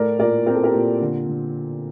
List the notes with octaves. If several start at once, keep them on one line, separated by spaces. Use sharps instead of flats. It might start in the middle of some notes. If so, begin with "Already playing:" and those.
Already playing: A2 A3 A#4 D5
A#2 A#4 D5
C4 A#4
A4
G4 A#4
A#2
D3
D3